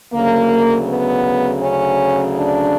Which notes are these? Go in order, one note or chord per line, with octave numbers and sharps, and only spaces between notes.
D2 C#3 F#3 A#3
B3
C#4
D4